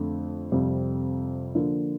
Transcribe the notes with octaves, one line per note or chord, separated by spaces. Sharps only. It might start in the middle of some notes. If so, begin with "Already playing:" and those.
Already playing: F2 D3 A3
F2 C3 G3 C4
D3 F3 A#3